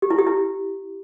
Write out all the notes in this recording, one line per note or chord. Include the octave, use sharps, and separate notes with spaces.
G4
E4
G4
E4